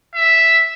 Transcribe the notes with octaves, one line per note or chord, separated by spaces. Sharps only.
E5